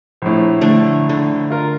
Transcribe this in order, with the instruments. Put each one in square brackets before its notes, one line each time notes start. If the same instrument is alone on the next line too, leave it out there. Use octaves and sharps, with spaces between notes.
[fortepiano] A#1 A2
[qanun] D3 A3
D3
[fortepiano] F4 A#4